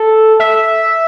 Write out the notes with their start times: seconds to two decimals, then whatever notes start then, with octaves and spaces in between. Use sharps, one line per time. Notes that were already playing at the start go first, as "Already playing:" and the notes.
Already playing: A4
0.40 E5